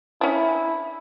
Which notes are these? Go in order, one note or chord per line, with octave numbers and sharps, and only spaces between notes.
C#4 D4 E4